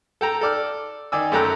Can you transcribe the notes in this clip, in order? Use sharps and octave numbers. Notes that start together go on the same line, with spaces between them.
A4 G5 A#5
A4 D5 F6
D#3 D#4 D5 G#5 E6
F#2 A3 A4 G5 A#5 F#6